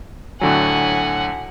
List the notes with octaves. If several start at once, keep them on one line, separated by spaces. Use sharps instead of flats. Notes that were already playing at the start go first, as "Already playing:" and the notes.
A2 D3 F#3 F#5 G#5